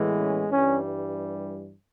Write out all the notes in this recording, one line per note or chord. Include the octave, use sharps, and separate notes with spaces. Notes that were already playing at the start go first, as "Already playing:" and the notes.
Already playing: A2 E3 G#3 B3
C#4
G2 E3 G3 C#4